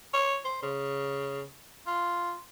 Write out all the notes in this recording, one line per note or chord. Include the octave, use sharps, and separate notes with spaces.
C#5
C5
C#3
F4